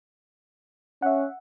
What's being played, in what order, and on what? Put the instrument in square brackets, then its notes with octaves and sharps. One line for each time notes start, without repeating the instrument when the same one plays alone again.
[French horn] C#4 [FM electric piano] E5 F#5